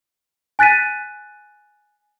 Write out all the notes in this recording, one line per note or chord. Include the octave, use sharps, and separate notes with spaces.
G#5 F#6 A6 B6 D#7